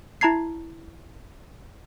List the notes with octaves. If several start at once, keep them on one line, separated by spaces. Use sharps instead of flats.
E4 A5 A#5 G#6 C7